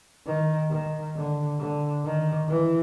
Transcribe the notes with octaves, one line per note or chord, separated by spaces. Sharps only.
D#3
D#3
D3
D3
D#3
E3